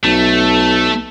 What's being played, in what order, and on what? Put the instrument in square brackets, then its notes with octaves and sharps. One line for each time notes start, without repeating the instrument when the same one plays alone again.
[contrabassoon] B1 [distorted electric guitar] A3